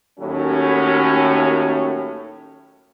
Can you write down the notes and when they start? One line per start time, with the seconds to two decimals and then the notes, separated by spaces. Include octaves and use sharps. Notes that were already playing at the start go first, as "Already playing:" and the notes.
0.19 D#2 A2 F#3 C#4